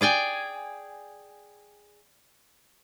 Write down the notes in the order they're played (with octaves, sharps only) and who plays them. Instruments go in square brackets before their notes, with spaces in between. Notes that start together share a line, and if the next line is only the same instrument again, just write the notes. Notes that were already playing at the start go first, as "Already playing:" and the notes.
[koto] G#4 D5 G5 G#5